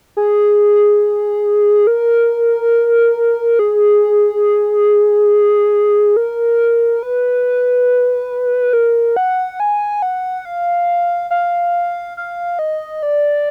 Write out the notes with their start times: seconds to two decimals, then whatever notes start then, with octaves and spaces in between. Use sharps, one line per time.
0.17 G#4
1.87 A#4
3.59 G#4
6.17 A#4
7.03 B4
8.73 A#4
9.16 F#5
9.60 G#5
10.02 F#5
10.45 F5
11.31 F5
12.17 F5
12.59 D#5
13.03 D5